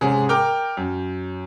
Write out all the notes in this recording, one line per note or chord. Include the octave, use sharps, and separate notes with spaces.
G#2 C3 C#4 G#4
A#4 G5 D6 F6 G6
F#2